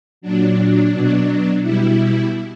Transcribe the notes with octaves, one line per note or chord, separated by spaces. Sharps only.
A#2 F#3 D4
B2 F#3
B2 G3 E4